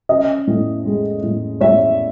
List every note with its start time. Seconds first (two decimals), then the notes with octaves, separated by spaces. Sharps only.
0.09 C#4 D#5
0.47 A2
0.85 G#3
1.23 A2
1.61 A2 C#5 E5